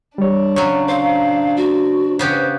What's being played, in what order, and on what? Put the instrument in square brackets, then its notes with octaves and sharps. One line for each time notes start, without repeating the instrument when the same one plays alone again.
[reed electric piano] G3 C#5 [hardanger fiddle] D4
[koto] C#3 F#3 [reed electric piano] C#5
[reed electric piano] C5 [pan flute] F5
[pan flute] F#4
[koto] C#3 B3 G4 [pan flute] C5